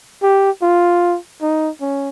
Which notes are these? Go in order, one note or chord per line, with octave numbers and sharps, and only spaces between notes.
G4
F4
D#4
C#4